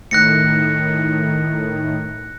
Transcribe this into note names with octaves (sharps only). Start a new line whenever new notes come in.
A2 D#3 F#6 A#6 C#7